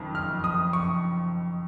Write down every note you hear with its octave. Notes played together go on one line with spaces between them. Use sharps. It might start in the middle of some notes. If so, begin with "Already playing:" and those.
Already playing: F#1 F2 D#3
F6
D#6
C#6